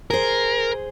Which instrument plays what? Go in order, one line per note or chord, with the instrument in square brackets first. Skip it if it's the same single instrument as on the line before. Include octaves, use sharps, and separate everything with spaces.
[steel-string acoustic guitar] G#4 C5 [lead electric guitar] A#4